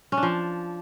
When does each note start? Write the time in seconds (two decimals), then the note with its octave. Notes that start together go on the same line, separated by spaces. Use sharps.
0.12 C#4
0.17 D4
0.23 F3